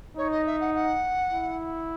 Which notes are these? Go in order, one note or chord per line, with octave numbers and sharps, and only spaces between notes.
D#4 C#5
D#5
E5
F#5
F#5
E4